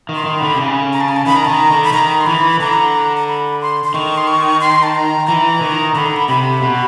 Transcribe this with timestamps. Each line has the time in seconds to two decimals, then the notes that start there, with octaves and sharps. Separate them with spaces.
0.09 D#3
0.15 C6
0.26 D#3
0.38 D3 B5
0.56 C3
0.60 C#3
0.93 A#5
1.01 A5
1.08 G#5
1.16 A5
1.26 D#3 B5
1.36 A#5
1.45 D#3 A5
1.55 A#5
1.71 D3
1.84 B5
1.93 D#3 A#5
2.21 C6
2.26 E3 B5
2.60 D3 A#5
3.17 A#5
3.27 B5
3.61 C6
3.84 C6
3.94 D#3 C#6
4.17 C6
4.27 C#6
4.61 C6
4.83 A5
4.95 A#5
5.27 E3 A#5
5.61 D#3
5.95 D3 B5
6.05 A#5
6.16 B5
6.28 C3 B5
6.62 B2